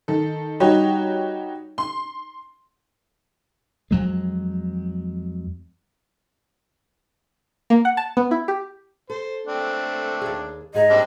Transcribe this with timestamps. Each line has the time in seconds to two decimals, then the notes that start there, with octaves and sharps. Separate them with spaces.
0.08 D#3 A4
0.60 G3 D#4 F#4 G4 C#5
1.78 C6
3.91 F2 F#3 G#3
7.70 A#3
7.85 F#5
7.97 A5
8.17 B3
8.31 E4
8.48 G4
9.10 A4 C5
9.47 A3 C4 D4
10.21 D#2 G#4
10.74 G#2 G#4 D#5 A#5
10.90 G3 C4 D4